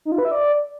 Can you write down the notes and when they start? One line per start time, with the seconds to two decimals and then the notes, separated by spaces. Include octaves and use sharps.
0.05 D#4
0.12 F4
0.18 B4
0.25 E5
0.31 D5